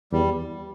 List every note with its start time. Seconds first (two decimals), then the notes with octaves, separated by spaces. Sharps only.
0.12 E2 G3